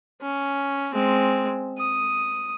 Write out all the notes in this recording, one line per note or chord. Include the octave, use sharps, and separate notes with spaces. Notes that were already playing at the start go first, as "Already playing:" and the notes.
C#4
G#3 C4
D#6